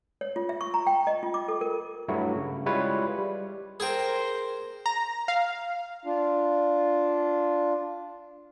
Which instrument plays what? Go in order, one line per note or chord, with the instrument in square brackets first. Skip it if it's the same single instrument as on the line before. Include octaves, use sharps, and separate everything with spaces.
[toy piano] C#5
F4
E5
C#6
A#5
G5
D#5
F4
D6
A4
A#4
[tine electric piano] G2 F#3 A3 E4 F#4
C#3
G3 G#3 E4 F4 B4 C#5
G3
[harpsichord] G#4 G5 [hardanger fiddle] A#4 C5
[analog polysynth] A#5
F5
[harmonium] D4 F4